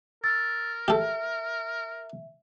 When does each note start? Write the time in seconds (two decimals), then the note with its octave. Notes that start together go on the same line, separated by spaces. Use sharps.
0.24 A#4 E6 A6
0.88 G4 A4 E5